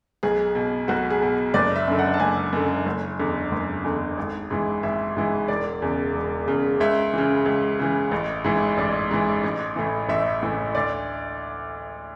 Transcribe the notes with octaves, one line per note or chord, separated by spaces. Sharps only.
B1 G#4
B2
B1 F#4
G#4
B2
F#1 D5
E5
F#2 D3
F#5
A5
F#1 G#5
F#2 D3
F#1
E2 D3
F#1
E2 D3
G#1
G#2 E3
G#1 E5
G#2 E3
E1 D5
E2 C#3
E1
E2 C#3
C#2 E5
C#3 E3
C#2
C#3 E3
A1
G#2 E3
A1 D5
G#2 E3
A1
A2 E3
A1 E5
A2 E3
D2 D5